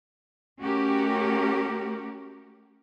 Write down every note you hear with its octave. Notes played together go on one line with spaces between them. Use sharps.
A3 C#4 F#4 G4 A#4